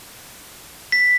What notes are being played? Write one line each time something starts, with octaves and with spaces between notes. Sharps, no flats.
B6